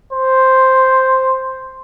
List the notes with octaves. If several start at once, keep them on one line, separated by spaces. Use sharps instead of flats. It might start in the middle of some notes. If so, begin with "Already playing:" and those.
C5